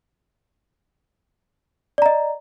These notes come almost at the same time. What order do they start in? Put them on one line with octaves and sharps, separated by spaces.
D5 A#5 D#5